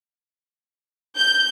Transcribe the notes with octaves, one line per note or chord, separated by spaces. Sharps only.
G6